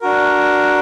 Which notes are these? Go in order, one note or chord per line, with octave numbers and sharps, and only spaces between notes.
D4 F#4 A#4